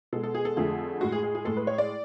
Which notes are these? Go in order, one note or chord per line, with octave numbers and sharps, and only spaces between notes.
B2 G#3 A4
A4
G#4
A4
F2 D3 F3 A3 G#4
A2 G#3 F#4
G#4
G#4
G#4
A2 G#3 A4
B4
C#5
D5